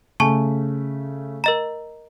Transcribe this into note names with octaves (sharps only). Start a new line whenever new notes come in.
C#3 A3 G#5 A5 C#6
A#4 D#5 A#5